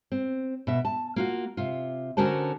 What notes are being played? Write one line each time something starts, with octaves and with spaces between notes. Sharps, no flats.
C4
B2 E5
A5
A#3 F4 F#4
C3 F4
D3 C#4 F#4 A#4 C5 A5